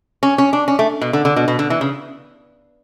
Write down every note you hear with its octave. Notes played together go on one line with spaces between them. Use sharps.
C#4
C#4
D4
C#4
A3
B2
D3
D3
B2
B2
D3
E3
C#3